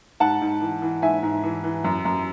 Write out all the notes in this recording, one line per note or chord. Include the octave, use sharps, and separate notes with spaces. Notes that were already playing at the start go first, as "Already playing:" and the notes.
G#2 F#5 A5
G#2
E3
E3
G#2 E5 G#5
G#2
E3
E3
F#2
F#2